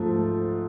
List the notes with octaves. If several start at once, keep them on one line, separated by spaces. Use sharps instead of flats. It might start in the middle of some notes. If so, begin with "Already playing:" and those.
Already playing: G#2 F3 A3